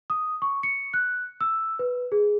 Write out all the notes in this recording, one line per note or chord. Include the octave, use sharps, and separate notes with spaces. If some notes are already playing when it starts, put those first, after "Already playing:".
D#6
C#6
C#7
F#6
E6
B4
G#4